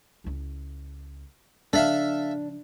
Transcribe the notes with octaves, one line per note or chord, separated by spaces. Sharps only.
C#2 E4
C#3 F3 D4 A4 E5 F5